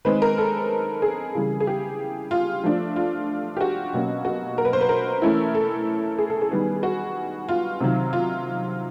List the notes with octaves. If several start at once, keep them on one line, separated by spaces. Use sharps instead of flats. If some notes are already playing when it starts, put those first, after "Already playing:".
D#3 G#3 C4 B4
A#4
A4
G#4
C#3 E3 G3
G#4
G4
F4
F3 A3 D4 F4
F4
G4
F#4
B2 F#3 A#3 C#4
F#4
A#4
B4
C5
B4
A#4
E3 A3 C#4 E4
A4
G#4
A4
G#4
D#3 G3 B3
F#4
F4
C3 D#3 F#3
F4